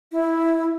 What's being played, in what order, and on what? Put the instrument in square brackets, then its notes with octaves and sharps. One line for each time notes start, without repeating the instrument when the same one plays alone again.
[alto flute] E4